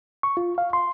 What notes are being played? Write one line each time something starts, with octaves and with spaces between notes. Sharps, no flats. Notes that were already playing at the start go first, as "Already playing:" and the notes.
C#6
F4
F5
C6